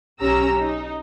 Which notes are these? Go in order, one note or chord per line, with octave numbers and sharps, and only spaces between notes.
B1 C#4 G4 A#5 E6
D#4